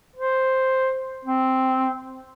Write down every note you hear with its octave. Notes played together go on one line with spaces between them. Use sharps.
C5
C4